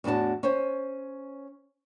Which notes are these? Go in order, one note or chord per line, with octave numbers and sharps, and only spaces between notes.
E2 A2 D4 F#4 A5
C#4 C5